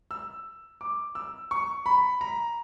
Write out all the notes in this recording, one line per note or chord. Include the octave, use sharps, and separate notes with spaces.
E6
D6
E6
C#6
B5
A#5